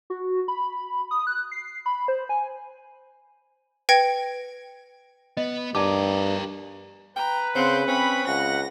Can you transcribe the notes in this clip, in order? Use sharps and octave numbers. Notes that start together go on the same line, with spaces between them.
F#4
B5
D#6
F#6
C7
B5
C5
G#5
B4 G5 G#6 A#6 C#7
B3 D#5
G2 G4 A#4 D5 A5 D6
B4 G5 A#5
C#3 C4 C5 F#5
C4 C#4 B5
C#2 F#5 A#6